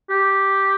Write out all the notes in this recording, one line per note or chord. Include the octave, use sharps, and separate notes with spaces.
G4